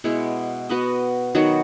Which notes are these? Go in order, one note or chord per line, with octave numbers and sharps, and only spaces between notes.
B2 G#3 B3 E4
B3 F#4 B4 D#5
D#3 F#3 B3 F#4